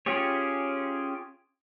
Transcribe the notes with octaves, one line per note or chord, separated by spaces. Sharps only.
C#4 F4 G4 G#4 C#5